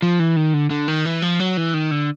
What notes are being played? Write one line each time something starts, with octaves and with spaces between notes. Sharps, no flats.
F3
E3
D#3
D3
D3
D#3
E3
F3
F#3
E3
D#3
D3